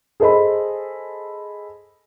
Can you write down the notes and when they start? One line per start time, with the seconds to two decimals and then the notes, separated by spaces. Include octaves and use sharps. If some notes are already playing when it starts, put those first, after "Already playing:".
0.20 G#4 A4 C5 D#5 B5